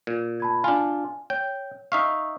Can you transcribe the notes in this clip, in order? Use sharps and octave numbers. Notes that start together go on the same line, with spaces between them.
A#2
A5 B5 G#6
D4 F4 G#5
C#5 G5
D#4 E5 F5 C#6